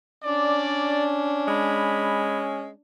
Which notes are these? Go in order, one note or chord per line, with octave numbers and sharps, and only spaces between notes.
C#4 D4 D5
G#3 B5